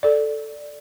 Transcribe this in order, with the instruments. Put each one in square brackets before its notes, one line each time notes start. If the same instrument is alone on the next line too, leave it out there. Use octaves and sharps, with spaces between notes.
[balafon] A4 D5